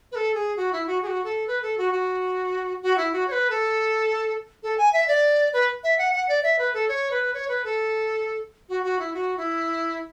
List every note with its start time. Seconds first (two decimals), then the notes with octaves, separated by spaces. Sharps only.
0.12 B4
0.16 A4
0.35 G#4
0.57 F#4
0.72 E4
0.87 F#4
1.02 G#4
1.07 F#4
1.24 A4
1.48 B4
1.62 A4
1.78 F#4
1.92 F#4
2.82 F#4
2.98 E4
3.13 F#4
3.28 C#5
3.32 B4
3.50 A4
4.63 A4
4.78 G#5
4.93 E5
5.08 D5
5.53 B4
5.84 E5
5.98 F#5
6.13 F#5
6.29 D5
6.43 E5
6.59 B4
6.74 A4
6.88 C#5
7.11 B4
7.34 C#5
7.49 B4
7.64 A4
8.69 F#4
8.84 F#4
8.99 E4
9.14 F#4
9.37 E4